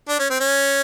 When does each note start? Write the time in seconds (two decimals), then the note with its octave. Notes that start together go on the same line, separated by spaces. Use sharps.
0.09 D4
0.19 C#4
0.30 C4
0.40 C#4